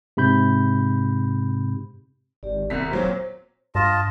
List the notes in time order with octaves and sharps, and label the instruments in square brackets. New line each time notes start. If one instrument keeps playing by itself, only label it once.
[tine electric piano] G#2 C3 B5 G6
[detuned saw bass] G#1 [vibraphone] G4 D5
[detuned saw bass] D#1 [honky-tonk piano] C2 B6 [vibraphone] A#3 G#4 A#5
[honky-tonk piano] A#2 F#3 C4 [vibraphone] C5 C#5
[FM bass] G2 [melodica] F4 D#5 A5